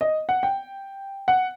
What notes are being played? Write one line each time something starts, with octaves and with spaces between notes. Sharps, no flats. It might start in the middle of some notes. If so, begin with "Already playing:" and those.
D#5
F#5
G5
F#5